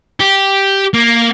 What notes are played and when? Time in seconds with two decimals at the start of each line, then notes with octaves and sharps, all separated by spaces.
0.20 G4
0.94 A#3